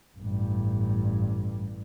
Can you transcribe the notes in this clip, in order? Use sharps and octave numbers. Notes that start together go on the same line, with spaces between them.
A1 G2